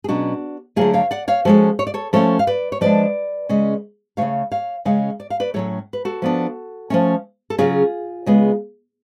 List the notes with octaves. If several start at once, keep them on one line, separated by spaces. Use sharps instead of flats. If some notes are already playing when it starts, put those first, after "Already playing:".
G#4
B2 F#3 C#4 D4 F#4
D3 F#3 A3 F4 G#4
C#5 F5
D5 F#5
C#5 F5
F3 G#3 C#4 F#4 A4
C#5
D5
A4 C#5
F3 A3 C#4 A4 C#5
F5
B4 D5
C#5
F3 G#3 D4 B4 D5
C#3 G#3 C#4
C#3 F3 A3 C#5 F5
C#5 F5
C#3 G#3 C#4 C#5 F5
D5
F5
B4 D5
A2 F#3 C#4 A4 C#5
B4
F#4 A4
F3 B3 D4
F3 A3 C#4
A4
C#3 F#3 C#4 F4 G#4
C#3 G#3 B3